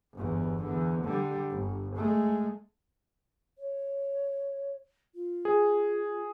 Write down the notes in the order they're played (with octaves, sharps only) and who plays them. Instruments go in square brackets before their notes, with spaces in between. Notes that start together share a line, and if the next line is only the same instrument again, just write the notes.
[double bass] G1 E2
E2 D3
D3 G3
G1
G#3 A3
[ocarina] C#5
F4
[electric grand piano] G#4